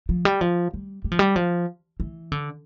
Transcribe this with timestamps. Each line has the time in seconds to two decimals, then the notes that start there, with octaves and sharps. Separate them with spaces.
0.09 F3
0.25 G3
0.41 F3
0.74 G3
1.04 G3
1.12 F3
1.19 G3
1.36 F3
2.00 E3
2.32 D3